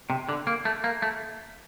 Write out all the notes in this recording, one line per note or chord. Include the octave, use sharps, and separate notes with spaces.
C3
D3
A#3
A3
A#3
A3